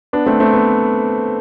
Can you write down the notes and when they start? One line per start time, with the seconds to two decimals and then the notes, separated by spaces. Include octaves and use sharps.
0.13 B3 D4
0.26 A3 C4
0.40 A3 C4
0.54 B3